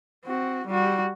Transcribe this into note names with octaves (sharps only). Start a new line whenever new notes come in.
C4 F#4
G3 F#4